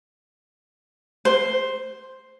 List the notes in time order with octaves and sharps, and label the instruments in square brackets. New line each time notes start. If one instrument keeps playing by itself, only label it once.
[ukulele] C5